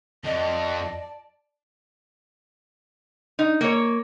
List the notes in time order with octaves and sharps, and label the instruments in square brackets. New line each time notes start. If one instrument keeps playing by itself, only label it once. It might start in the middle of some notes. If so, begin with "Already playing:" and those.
[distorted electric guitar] F2 [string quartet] D5 A5 [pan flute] D#5
[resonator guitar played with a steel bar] D#4
A#3 C#5